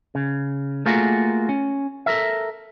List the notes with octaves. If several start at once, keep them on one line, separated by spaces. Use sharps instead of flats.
C#3
A3 A#3 F4 F#4 G#4 A#4
C#4
A4 A#4 E5